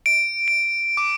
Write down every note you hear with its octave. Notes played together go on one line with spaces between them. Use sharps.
D7
D7
D6